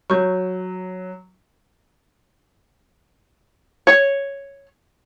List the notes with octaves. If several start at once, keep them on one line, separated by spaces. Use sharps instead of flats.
F#3 C#6 G6
C#5